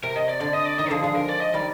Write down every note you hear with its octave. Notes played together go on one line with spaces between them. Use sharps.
C3 A#4
D#5
D5
D3 D5
D#5
D5
D#3 D#5
D3 F3 G#4
F3 G#3 G#4
A#4
D5
D#5
D#3 G3 D5